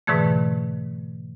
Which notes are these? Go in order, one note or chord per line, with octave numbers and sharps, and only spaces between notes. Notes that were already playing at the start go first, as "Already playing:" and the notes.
G#2 B2 D3 E3 A3